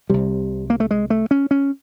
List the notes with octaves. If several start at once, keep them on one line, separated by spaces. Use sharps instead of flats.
C2 C3 G3
A#3
A3
G#3
A3
C#4
C#4